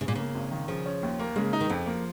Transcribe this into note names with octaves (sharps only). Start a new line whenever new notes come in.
G#2 C#3
A#2
C#3 A#3
G#1
D#3
C#3 F3
C#4
D#2
A#3
C#3 G#3
D#4
D#3
F2 F3
A#3